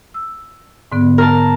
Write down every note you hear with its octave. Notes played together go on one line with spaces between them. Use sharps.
E6
G#2 D3 B3
A#4 A5